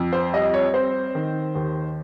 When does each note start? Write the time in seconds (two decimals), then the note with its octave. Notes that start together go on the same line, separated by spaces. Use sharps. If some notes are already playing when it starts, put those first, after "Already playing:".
Already playing: F2
0.13 C5
0.33 G3 D#5
0.54 C#5
0.74 C4 C5
1.15 D#3
1.55 D#2